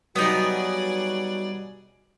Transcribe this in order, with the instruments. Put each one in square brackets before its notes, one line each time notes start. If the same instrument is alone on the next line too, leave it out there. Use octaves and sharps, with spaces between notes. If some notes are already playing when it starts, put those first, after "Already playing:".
[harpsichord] F#3 G3 [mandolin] B3 D#4 [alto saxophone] F#4 [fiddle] G#4 D5